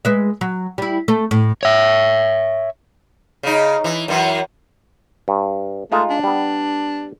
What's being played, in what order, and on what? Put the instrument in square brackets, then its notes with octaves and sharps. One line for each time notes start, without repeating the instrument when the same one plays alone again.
[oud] G#3 B4 E5
F#3
G3 E4
A3
A2
[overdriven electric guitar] C#5 E5
[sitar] C#3 D#4
E3
F#2 E3
[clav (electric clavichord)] G2
[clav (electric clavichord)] G#3 D#4 F4 [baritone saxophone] A3
[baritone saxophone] D4
[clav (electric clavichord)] G3 B3